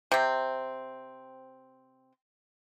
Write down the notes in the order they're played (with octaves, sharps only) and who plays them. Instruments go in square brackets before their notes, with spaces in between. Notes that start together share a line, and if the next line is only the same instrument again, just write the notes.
[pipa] C3 C4